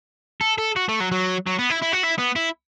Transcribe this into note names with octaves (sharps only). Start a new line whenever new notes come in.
A4
A4
F#4
A3
F#3
F#3
F#3
B3
E4
E4
F#4
E4
B3
E4